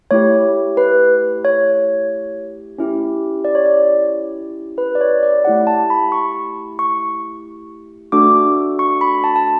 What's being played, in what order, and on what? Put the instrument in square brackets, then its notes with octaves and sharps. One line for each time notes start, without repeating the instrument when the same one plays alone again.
[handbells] A3 E4 G4 C#5
B4
C#5
C#4 E4 G4
D5
C#5
D5
B4
D5
C#5
D5
A3 E4 G4 F#5
A5
B5
C#6
C#6
A3 D4 F#4 A4 D6
C#6
B5
A5
A5